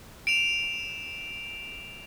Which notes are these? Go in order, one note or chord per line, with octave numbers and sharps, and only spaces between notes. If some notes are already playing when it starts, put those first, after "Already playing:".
D7 E7 F7